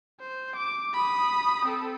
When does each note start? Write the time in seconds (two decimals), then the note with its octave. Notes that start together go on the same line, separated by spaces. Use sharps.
0.20 C5
0.56 D6
0.94 B5 D#6
1.66 C4 A4